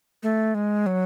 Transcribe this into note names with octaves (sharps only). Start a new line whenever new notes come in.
A3
G#3
F#3